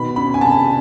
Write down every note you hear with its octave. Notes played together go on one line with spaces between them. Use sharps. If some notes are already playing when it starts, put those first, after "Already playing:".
Already playing: B2 D#3 B5
C#4 B5
G#5
C2 A5